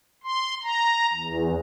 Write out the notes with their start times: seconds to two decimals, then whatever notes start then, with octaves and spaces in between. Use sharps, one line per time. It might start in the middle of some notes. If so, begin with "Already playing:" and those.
0.24 C6
0.63 A#5
1.14 E2